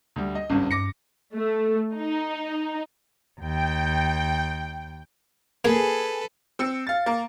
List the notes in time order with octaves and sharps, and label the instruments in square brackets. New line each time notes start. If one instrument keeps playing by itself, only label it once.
[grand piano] D2 G3
D#5
[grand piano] G#1 C#2 G2 [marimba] C#4
[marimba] G2 [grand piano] D6 A#6 C#7
[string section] A3
D#4
[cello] D#2 [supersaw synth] G5
[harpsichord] A#3 [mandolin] G#4 [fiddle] A4 B4
[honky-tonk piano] C4 E6 C#7
F5 A6
A#3 A#4